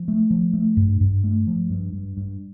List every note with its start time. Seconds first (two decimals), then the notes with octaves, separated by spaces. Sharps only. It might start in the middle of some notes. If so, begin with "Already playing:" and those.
Already playing: F3
0.08 A3
0.31 F3
0.53 A3
0.77 G2
1.01 G2
1.24 A3
1.47 F3
1.70 G2
1.93 G2
2.17 G2